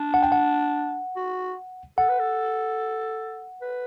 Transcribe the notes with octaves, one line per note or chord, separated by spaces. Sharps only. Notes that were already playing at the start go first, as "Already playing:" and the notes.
Already playing: D4
F#5
G5
F#5
F#4
A4 F#5
B4
A4
B4